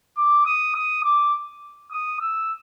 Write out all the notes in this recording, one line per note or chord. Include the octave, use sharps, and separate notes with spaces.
D6
D#6
D#6
D6
D#6
E6